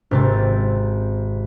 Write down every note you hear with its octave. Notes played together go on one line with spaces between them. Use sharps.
G#1 C3 C4 A6